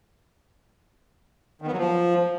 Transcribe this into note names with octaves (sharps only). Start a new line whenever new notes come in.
D#3
B3
F#3
F3